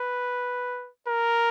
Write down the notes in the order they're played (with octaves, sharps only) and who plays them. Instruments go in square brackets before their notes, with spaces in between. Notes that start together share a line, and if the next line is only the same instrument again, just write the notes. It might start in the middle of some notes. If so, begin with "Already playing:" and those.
Already playing: [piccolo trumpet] B4
A#4